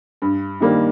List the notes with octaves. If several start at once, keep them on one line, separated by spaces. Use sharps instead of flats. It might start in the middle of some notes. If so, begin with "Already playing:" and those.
G2
D#3 G3 A#3 D4